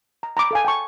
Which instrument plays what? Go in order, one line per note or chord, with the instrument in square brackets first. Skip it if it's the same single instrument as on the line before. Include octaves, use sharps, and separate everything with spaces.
[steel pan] A#5
A#5 B5 D6
A4 F5 G#5
G5 A5 C#6